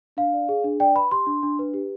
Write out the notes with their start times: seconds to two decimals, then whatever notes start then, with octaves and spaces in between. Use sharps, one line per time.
0.17 D4 F5
0.33 D5
0.49 G#4
0.64 D4
0.80 D5 G5
0.95 B4 B5
1.11 G4 C6
1.26 D4
1.43 D4
1.59 B4
1.74 G4